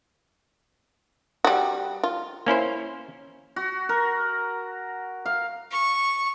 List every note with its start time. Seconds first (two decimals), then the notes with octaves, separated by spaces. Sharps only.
1.45 G3 F#4
2.03 F4
2.46 A#3 C#4 E4 C5
3.56 F#4
3.89 A#4
5.25 F5
5.71 C#6